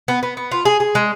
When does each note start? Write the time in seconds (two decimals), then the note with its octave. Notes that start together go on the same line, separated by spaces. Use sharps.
0.08 B3
0.23 B3
0.37 B3
0.52 F4
0.65 G#4
0.80 G#4
0.95 G#3